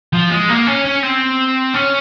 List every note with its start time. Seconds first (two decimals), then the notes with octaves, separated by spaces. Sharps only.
0.13 F3
0.30 G#3
0.49 A#3
0.66 C#4
0.84 C#4
1.03 C4
1.74 C#4